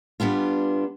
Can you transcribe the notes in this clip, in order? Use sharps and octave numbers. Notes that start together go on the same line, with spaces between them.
G3 B3 D4 F4